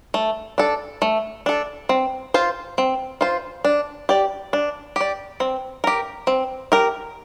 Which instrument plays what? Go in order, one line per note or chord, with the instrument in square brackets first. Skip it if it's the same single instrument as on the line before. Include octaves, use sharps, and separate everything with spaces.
[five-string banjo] A3
D4 A4
A3
D4 A4
C4
F4 C5
C4
F4 C5
D4
G4 D5
D4
G4 D5
C4
G4 A#4
C4
G4 A#4